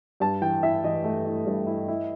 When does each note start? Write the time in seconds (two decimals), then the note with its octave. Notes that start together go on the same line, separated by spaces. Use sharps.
0.20 G2 A5
0.42 E3 G5
0.63 E4 E5
0.84 E3 D#5
1.04 A3
1.25 E4
1.46 G2
1.67 E4
1.88 E4